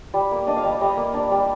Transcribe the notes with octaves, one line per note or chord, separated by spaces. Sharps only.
G3
A#3
D4 D#5
F5
G3 D#5
G3 D#5
A#3
D4
G3